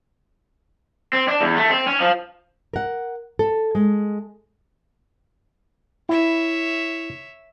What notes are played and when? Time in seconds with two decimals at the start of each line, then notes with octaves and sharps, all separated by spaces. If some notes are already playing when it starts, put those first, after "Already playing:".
1.13 C4
1.28 D4
1.41 E2
1.56 A3
1.69 C4
1.87 C#4
2.00 F3
2.73 A#4 F#5
3.39 A4
3.75 G#3
6.09 E4 C#5 E5